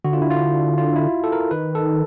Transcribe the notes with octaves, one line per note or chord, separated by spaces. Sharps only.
D3 F#4
F4
E4
F4
F4
E4
A4
A#4
D#3 B4
A4